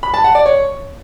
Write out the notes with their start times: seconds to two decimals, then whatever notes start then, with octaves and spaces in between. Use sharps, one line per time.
0.03 B5
0.14 A5
0.24 F#5
0.35 D5
0.46 C#5